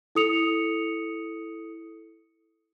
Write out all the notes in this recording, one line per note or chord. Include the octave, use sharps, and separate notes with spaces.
E4 A4 D#6 C#7 F7